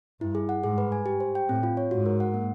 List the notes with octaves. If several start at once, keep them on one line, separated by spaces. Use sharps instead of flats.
G2 E4
G#4
F#5
G#2 G#4
B4
G#5
G4
C5
G5
A2 C4
F4
C#5
G#2 F#4
A#4
F#5
A#3